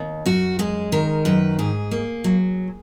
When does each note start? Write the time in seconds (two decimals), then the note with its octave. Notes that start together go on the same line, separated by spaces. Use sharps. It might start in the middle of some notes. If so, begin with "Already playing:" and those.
Already playing: D#2
0.26 F#2 F#4
0.59 G#3 G#4
0.92 D#3 A#4
1.25 F#2 B4
1.59 G#2 G#4
1.91 A#3
2.24 F#3